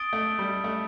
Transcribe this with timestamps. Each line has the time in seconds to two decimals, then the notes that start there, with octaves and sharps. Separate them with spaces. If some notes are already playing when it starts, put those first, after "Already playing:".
Already playing: D#6 A6 D7 G7
0.13 A3
0.39 G3
0.64 A3